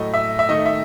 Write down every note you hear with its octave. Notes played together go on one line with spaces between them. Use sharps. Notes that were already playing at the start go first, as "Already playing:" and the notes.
Already playing: A2 F#3 A3 D#5
E5
E5
D#3 A3 D#5
E5